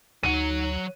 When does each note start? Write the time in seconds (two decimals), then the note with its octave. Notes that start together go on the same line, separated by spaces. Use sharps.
0.23 D2 F#3 D#4 F#5 D#7